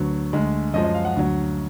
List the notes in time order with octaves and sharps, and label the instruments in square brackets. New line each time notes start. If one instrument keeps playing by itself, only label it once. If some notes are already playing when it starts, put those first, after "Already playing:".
Already playing: [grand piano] D2 D3 F#3 B4
D2 D3 G#3
F#2 F3 G#3 D#5
D#5
F5
F#5
D2 D3 F#3